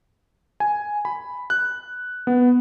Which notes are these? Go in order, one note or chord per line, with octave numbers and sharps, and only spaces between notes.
G#5
B5
F#6
B3